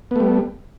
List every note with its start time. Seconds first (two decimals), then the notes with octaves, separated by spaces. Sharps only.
0.11 B3
0.16 A3
0.20 G3